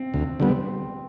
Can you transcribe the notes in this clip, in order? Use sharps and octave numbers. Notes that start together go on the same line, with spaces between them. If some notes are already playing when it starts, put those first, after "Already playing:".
Already playing: C4
D2
D3 G3 B3